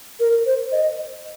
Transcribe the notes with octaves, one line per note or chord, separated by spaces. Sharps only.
A#4
C5
D#5